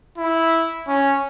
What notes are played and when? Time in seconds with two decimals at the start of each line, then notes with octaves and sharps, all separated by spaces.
0.18 E4
0.88 C#4